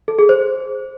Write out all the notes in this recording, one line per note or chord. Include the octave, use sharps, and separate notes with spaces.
A4
G#4
C5